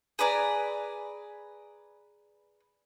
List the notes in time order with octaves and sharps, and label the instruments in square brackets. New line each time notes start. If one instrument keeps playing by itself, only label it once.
[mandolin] G#4 B4 D5 A#5